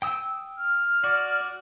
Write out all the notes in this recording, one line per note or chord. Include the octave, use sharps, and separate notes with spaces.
G5 D#6 E6
F6
F#4 D5